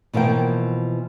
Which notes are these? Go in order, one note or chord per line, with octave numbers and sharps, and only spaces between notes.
B2 E3 F3 A#3 G5